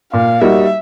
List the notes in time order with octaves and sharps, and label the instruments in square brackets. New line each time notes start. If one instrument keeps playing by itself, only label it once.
[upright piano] A#2 [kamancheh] F5
[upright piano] G3 A#3 D#4 F#4 [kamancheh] E5